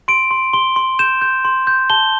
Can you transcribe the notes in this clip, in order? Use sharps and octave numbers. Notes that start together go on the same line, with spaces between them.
C6 D7
C6
C6 G7
C6
G6 E7
G6
C6
G6
A5 G7